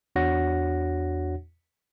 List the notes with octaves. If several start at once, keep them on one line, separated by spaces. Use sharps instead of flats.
E2 D4 F#4 C#5 F#5 A#6